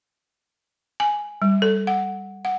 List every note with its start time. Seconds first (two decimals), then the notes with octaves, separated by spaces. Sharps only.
1.00 G#5
1.42 G3
1.62 A4
1.87 F#5
2.45 F#5